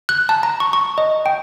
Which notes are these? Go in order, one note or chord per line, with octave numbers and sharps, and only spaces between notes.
F#6
A5
A#5
C#6
C#6
D#5
G5